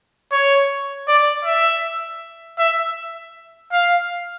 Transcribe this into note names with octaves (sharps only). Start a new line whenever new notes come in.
C#5
D5
E5
E5
F5